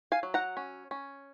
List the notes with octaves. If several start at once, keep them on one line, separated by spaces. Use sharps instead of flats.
F5 G#5
F#3
F#5 A#5
C#4
C#4